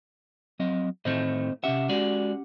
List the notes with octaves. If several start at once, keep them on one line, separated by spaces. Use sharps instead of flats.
F#3 C4 D#5
A2 D#3 A3 C4 C5 D#5
C3 C#4 G4 E5 F#5
G#3 F#4 D5